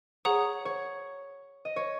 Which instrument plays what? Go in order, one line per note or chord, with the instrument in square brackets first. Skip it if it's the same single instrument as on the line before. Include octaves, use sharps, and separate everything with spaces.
[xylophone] G#4 F#5 A#5 D#6 [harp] C#5
[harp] C#5
D#5
C#5